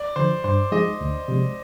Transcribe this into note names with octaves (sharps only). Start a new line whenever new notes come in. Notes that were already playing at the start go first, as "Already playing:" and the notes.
Already playing: D5
D3 F3 C5
G2 C5
F3 G#3 D#4 G#4 D#5
D2
C3 F3 G#3